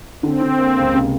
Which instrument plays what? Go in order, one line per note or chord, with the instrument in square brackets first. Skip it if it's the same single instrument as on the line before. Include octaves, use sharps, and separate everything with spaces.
[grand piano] D3 [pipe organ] C4
[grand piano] D3
A#3
C#2
C3